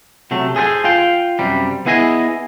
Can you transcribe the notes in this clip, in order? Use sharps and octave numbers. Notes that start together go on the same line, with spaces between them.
C3 F#3 A3
G#4 A4 C5 E5 G#5
F4 F5 G5
F#2 C3 G3
B3 E4 G#4 D#5 G#5